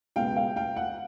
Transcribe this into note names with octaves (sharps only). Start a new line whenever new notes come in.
C#2 B2 G#3 B3 F5 G5
F5 G5
F5 G5
F#5